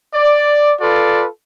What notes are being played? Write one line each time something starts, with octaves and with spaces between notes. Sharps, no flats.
D5
F4 A4 B4 D5